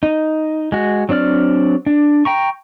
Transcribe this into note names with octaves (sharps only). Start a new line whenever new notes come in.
D#4
G#3 F#4
F#3 C4 D4 D5 F6
D4
G5 A#5 C#6